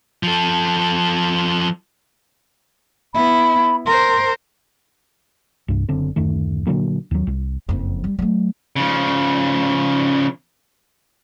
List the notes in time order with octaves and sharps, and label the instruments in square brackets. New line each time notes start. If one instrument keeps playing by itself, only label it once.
[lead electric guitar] F3 A4
[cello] B3 E4 [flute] B5
[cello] A#4 C5 [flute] C6
[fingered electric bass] C2 G2
F#1 D3 C4
D1 F#2 D#3 A3
A#2 D3 F#3 A#3
D#2 F#3
C2
[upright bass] F#1 F2
G3
F#3 A3
[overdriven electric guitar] C#3 F3